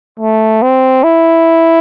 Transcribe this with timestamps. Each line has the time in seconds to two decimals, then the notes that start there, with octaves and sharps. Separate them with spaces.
0.19 A3
0.62 C4
1.03 E4